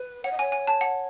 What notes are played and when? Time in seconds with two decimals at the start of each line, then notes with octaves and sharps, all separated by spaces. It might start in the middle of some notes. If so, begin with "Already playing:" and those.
Already playing: B4
0.24 C#5 F#5
0.31 D#5
0.39 C#5 G#5
0.52 G#5
0.67 A5
0.81 F#5